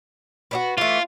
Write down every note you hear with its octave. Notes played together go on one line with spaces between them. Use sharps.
B3 D4 F#4
E3 A3 F4